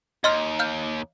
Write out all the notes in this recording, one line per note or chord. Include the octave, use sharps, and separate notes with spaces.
D#2 D#5 C6 F6
F5 F6 G6